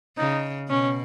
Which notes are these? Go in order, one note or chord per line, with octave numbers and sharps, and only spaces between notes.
C#3 D#4
B2 C#4